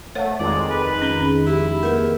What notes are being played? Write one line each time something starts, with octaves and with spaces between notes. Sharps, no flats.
A3 C5 C#5 F#5
F2 D#3 G#3 D5
B4
C#4 B5
E4 G4
A#3 A#4 B4